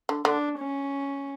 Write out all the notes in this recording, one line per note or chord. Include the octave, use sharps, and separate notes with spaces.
D3
D3 D4
C#4